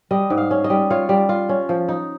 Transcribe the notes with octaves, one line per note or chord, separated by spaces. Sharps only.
G3 D#5
G#2
F5
C#4
D#5
G3
F4 C#5
G3
F4
C#4
F3
D#4